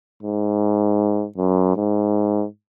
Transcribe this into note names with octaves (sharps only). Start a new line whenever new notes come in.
G#2
F#2
G#2